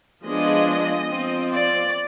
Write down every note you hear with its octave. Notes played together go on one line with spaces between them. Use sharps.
F3 G#3 B3 D4 D#5
F3 C4
D5